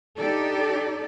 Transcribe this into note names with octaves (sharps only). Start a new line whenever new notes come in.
D4 D#4 G4 A4 D5